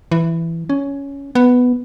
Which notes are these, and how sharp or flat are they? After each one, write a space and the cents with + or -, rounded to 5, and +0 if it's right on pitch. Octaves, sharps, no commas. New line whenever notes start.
E3 +10
C#4 +10
B3 +5